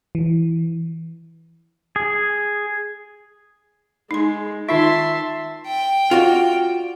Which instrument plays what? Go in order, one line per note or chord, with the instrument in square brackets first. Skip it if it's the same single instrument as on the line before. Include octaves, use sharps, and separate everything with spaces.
[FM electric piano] E3
[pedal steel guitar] G#4
[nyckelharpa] G#3 [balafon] D#4 C6
[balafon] D#3 D#4 F4 [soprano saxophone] E5 [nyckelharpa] A5 C6
[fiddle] G5
[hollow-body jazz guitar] F4 F#4 D5